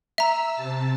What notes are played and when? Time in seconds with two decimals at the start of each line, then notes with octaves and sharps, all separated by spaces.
0.18 E5 A#5 E6
0.54 C3 A5